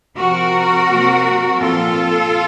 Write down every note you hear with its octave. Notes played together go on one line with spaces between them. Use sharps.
C3 F3 C4 F#4 A#4
C3 F#3 A#3
A#2 F3 C4 F4 A4